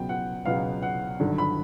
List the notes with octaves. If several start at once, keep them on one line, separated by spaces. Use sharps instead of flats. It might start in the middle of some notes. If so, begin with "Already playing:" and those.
Already playing: C#2 B2 F#3 B3 G5
F#5
C#2 B2 F#3 B3 F5
F#5
G#1 G2 D3 F#3
B5